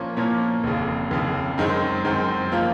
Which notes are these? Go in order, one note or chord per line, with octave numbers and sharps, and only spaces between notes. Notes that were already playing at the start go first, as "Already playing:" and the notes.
Already playing: A#2 F3 A#3 C#4
A#2 F3 A#3 C#4
F1 D#2 C#3
F1 D#2 C#3
F#2 D#3 G#3 C4
F#2 D#3 G#3 C4
F3 A#3 F4